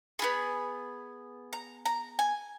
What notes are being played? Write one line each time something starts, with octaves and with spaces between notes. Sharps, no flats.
B3 F4 G#4 B5
A#5
A#5
G#5